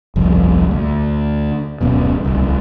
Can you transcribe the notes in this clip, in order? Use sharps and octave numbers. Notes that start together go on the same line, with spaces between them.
G1 C2 F2
D2
D1 F#2 B2
D1 C2